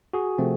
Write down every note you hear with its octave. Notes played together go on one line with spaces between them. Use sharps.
F#4 G#4
C3 F3 A3 C4